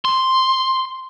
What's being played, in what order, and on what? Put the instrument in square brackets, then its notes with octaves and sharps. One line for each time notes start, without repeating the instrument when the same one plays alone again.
[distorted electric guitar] C6